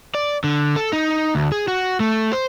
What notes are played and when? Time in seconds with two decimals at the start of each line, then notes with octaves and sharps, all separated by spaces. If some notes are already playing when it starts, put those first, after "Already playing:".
0.15 D5
0.44 D3
0.76 A4
0.93 D#4
1.35 D2
1.52 G#4
1.68 F#4
2.00 A3
2.33 C5